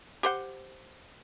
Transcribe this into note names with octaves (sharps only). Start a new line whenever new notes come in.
G4 C5 F#5